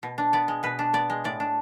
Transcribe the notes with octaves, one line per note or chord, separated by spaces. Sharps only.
B2
D4
B3 D5
G#3
B2 B4
D4
B3 D5
G#3
A2 D5
D4